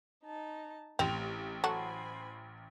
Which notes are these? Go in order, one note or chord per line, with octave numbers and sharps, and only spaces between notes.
D#4 A5
A1 A3 C4 G4 F7
F#3 F#4 A4 C5 G#5 B5